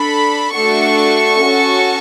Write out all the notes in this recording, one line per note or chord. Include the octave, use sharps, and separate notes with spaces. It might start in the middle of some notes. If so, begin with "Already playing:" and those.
Already playing: D4 A4 B5
A3 D4 F#4 A4 C#6
C#4 F#4 A4